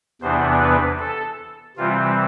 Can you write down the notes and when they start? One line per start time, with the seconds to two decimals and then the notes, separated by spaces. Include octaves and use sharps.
0.21 E2 C3 E3 B3 D4 C5
0.60 B4
0.99 A4
1.77 C3 E3 G3 C4 F4